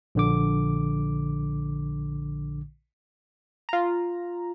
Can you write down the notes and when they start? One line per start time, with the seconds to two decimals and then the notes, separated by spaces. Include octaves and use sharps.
0.15 A#1 D3 D6
3.69 F4 A#5